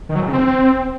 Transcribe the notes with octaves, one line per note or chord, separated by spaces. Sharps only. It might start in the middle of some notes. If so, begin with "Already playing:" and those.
D#3
F#3
G#2
C#3
C4